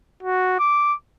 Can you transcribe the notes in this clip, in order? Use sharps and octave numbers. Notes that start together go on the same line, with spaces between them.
F#4
D6